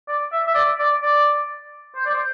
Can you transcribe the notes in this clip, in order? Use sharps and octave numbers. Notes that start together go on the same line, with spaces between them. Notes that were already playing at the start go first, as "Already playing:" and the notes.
D5
E5
E5
D5
D5
D5
C5
D5
C5